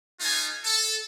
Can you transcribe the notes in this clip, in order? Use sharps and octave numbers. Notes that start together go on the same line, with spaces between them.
A3 D#4 F4 G#5
A4